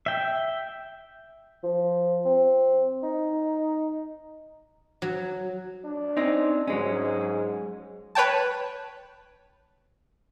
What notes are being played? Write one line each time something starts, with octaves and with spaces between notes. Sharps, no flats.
E5 G5
F3
C4
D#4
F#3
D4
C4 C#4 D#4
G#2 F#3 G#3 C#4
B4 C#5 G5 A5